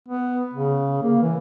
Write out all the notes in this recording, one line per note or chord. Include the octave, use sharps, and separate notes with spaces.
B3
C#3
A#3
E3